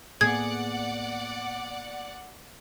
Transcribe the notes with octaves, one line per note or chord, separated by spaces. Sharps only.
A2 A#3 B3 G#4 D5 F#5 G#6